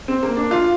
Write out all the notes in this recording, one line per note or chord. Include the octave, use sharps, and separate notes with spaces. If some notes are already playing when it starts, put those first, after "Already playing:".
C4
A#3
D4
F4